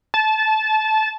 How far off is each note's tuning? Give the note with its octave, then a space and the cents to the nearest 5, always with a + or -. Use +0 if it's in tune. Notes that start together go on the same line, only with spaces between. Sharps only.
A5 -20